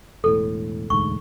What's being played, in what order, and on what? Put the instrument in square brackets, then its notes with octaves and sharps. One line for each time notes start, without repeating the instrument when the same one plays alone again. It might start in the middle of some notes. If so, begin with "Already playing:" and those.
[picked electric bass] E1 A2 [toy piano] A4
[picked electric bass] E1 D2 G#2 [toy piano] C#6